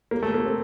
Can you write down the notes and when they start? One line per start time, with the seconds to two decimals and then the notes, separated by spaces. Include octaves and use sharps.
0.11 A#3
0.22 A3
0.34 A#3
0.46 C4